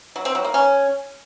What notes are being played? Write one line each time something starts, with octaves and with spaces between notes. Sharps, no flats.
F#3
C4
F#3
A#3
C#4